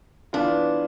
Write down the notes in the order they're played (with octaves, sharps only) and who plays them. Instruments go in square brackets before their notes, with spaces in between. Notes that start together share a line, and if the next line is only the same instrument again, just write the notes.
[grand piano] E3 B3 F4 [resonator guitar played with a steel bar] D4